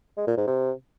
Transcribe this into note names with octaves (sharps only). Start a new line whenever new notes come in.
G#3
A#2
G#2
C3